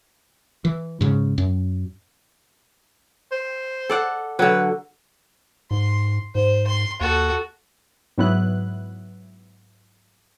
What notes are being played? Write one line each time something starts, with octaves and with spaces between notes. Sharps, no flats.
E3
G#2 C#3
F#2
C5
A4 D5 F#5
D3 F#3 B4
G#2 C6
G#2 C5
C6
D#2 F#4 A4
G#2 F#3 B3 E4 F#6